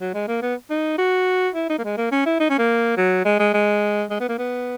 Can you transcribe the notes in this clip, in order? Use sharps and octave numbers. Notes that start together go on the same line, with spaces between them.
F#3
G#3
A#3
B3
D#4
F#4
E4
D#4
A#3
G#3
A#3
C#4
E4
D#4
C#4
A#3
F#3
G#3
G#3
G#3
G#3
B3
A#3
B3